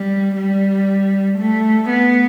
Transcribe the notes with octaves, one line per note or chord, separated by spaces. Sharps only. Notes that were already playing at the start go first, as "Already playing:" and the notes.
Already playing: G3
G3
A3
B3